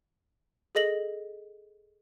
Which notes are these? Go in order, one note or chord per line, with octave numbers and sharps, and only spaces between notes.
G#4 A4 D#5 A#6 F#7